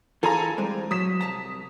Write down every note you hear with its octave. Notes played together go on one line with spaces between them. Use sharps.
E3 F4 G#4 A4 G#5 A#5
G3 G#3 C4
F#3 D#6 B6 E7
C2 A5 A#5